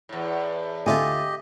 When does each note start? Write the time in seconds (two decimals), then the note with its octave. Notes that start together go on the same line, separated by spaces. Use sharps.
0.09 E2 A2
0.86 D2 F4 G4 A4 D#5 E5 G#5